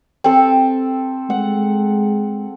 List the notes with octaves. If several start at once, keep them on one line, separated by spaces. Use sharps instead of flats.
C4 A4
G#3 F#5